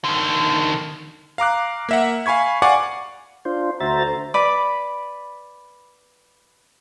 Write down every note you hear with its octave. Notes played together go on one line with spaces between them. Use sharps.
D3 D#3
F5 A#5 D6 F#6
A#3 E5 F#5
F5 G#5 B5 C#6 G#6
D5 F5 F#5 G#5 C#6 D6
D4 F4 C5
D2 F#4 C5 E5 A#5 A6
B4 D5 B5 D6